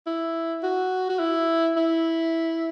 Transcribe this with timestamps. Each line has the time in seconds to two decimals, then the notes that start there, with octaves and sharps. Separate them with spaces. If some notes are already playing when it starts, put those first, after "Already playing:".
0.07 E4
0.63 F#4
1.09 F#4
1.19 E4
1.76 E4